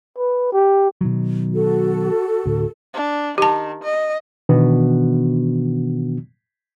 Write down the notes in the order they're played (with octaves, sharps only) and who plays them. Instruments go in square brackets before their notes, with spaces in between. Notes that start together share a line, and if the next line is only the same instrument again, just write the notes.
[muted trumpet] B4
G4
[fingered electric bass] B2 D#3 F#3
[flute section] F#4 A4
[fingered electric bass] D2 A2
[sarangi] D4
[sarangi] D#3 [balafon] G4 A5
[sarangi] D#5
[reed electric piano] B2 D#3 E3 B3 D4 F#4